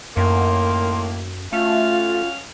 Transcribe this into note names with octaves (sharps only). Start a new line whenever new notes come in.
F#2 A2 D#3 A#3 C6
A3 C#4 F4 F#4 F5